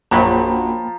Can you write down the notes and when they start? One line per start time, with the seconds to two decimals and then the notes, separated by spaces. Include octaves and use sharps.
0.11 A#1 F#2 F3 F#3 A#3 G5 A#5 B5